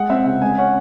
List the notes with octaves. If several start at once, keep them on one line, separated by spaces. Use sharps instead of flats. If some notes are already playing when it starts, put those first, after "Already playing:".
Already playing: G#3 F#5
C4 E5
C#3 F#5
G#3 G#5
C#4 F#5